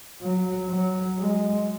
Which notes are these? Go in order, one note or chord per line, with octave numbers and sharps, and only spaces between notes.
F#3
F#3
G#3